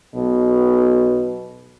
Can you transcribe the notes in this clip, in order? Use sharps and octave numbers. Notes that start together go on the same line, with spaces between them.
B1 B2